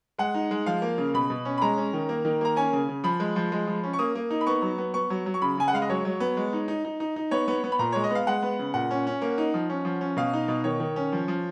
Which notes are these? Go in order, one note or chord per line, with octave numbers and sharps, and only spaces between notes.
G#3 F#5
D#4
G#3
F3 F5
A#3
C#3
B2 B5
B2
C#4
B5
G#3 A#5
C#4
D#3
A#3
D#3
A#3 A#5
C#4 G#5
C#3
C#3
F3 B5
G#3
F3
G#3
F3
C#4
C#6
A#3 D#6
A#3
D#4
B5
B3 C#6
F#3
B3
B3 C#6
F#3
F#3
C#6
C#3 B5
C#3 G#5
F#5
G#3 F5
D#5
F#3 C#5
F#3
B3
G#3
D#4
D#4
D#4
D#4
D#4
B3 C#5
B3
B3
B5
A#2 A#5
G#3 C#5
D#5
B3 F5
G#3 F#5
B3
C#3
A#2 F#5
C#4
C#4
A#3
D#4
F3
C#4
F3
C#4
B2 F5
D#4
B2
D#3 C#5
D#3
C#4
F3
F3